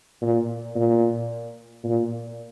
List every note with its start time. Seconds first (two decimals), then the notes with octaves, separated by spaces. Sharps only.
0.22 A#2
0.75 A#2
1.84 A#2